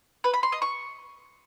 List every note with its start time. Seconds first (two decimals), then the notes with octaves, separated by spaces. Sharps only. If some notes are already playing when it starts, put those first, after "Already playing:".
0.24 B4
0.34 B5
0.43 C6
0.52 D#5
0.62 C#6